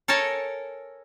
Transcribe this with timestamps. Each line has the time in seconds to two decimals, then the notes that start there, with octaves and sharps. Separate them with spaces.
0.08 A4 A#4 C#5 G#5 A5